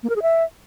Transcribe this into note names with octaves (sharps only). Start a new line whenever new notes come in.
A#3
A#4
G#4
E5